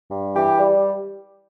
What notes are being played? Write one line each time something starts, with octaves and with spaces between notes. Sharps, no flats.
G2
E3 G4
G3